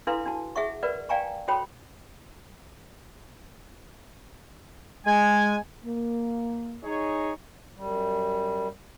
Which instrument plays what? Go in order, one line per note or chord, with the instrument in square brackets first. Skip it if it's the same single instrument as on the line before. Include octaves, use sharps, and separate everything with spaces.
[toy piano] D4 E4 A4 B4 F5 C6
D4 F#4 A5
G#4 E5 F#5 C#6
A#4 B4 D5 F#5
D5 F5 G5 G#5 A#5 C#6
F#4 A4 C5 C#5 G5 B5
[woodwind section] G#3 G#5
[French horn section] A#3
[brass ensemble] D#4 G#4 C#5
[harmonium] F#2 G3